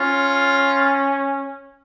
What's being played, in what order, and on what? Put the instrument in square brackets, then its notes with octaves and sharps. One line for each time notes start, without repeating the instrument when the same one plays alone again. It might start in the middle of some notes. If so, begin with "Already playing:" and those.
Already playing: [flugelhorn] C#4 [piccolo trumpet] F4